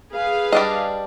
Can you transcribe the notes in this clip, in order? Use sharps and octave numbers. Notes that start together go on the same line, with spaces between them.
G#4 B4 F5
G3 D4 D#5